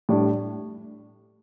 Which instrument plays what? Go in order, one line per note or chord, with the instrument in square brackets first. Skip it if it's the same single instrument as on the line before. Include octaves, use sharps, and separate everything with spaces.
[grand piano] A2 G3 D4